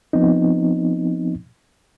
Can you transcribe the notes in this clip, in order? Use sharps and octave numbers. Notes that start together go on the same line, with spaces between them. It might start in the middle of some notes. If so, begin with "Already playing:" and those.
F3 B3 C4 D#4